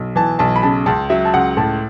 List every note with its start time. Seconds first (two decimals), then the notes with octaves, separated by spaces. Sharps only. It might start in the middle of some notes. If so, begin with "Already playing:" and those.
Already playing: B1
0.16 E3 A5
0.39 B1 A5
0.56 B5
0.63 C#3 A5
0.86 C#2 A5
1.10 F#3 E5
1.25 A5
1.34 C#2 F#5
1.57 A2 A5